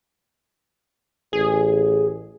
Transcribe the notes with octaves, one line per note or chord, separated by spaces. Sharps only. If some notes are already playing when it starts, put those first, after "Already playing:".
A1 G#4